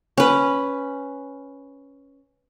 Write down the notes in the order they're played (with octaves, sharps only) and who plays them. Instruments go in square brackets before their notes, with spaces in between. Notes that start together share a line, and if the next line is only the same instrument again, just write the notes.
[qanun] C#4 B4